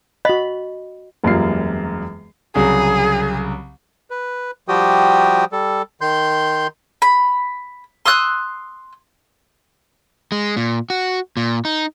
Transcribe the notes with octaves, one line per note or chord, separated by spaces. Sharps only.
F#4 D#5 B5
E1 F#2 G3 A#3 F4 C7
C2 C#3 F#3 G#4
B4
F3 G3 F#4 G4 G5 D#6
G3 A4
D#3 C6 G6
B5
C6 D#6 E6 F#6
G#3
A#2
F#4
A#2
D#4